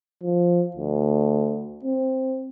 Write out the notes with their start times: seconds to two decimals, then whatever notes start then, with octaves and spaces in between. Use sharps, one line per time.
0.23 F3
0.76 D2
1.85 C4